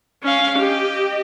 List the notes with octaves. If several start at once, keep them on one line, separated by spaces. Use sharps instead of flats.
C#4 F5
G4 D#5